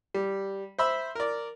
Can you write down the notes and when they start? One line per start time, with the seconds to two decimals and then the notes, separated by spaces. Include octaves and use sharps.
0.14 G3
0.79 C5 E5 B5 E6
1.15 A#4 D5